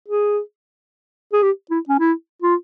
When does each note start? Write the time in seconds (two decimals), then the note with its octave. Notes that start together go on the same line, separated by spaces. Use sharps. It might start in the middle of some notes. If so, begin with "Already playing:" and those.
0.08 G#4
1.33 G#4
1.43 G4
1.71 E4
1.89 C#4
2.00 E4
2.42 F4